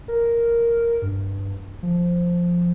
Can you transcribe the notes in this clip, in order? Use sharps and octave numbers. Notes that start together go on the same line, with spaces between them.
A#4
G2
F3